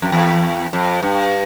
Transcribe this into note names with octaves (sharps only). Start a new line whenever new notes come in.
F2
E2
F2
G2